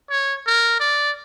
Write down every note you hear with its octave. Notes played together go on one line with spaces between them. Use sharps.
C#5
A#4
D5